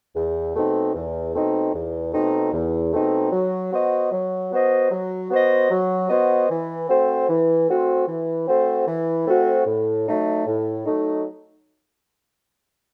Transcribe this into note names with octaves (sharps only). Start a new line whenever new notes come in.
E2
B2 A3 C4 D#4
E2
B2 A3 C4 D#4
E2
B2 A3 C4 D#4
E2
B2 A3 C4 D#4
F#3
B3 F#4 C5 D#5
F#3
B3 F#4 C5 D#5
F#3
B3 F#4 C5 D#5
F#3
B3 F#4 C5 D#5
E3
A3 C4 F#4 C5
E3
A3 C4 F#4 C5
E3
A3 C4 F#4 C5
E3
A3 C4 F#4 C5
A2
F#3 A3 D#4
A2
F#3 A3 D#4